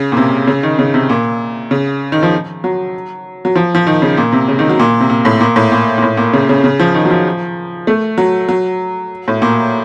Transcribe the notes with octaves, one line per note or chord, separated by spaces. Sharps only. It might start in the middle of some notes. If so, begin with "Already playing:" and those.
Already playing: C#3
A#2
C3
C#3
D#3
C#3
C3
A#2
C#3
D#3
F3
F#3
F#3
F3
F3
D#3
C#3
A#2
C3
C#3
D#3
F#3
A#2
C3
A#2
A2
A#2
A2
A#2
A#2
A2
A#2
C#3
C#3
C#3
F3
D#3
F#3
F3
A3
F#3
F#3
A2
A#2